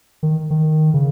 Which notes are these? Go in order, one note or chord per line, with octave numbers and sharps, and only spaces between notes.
D#3
D#3
C#3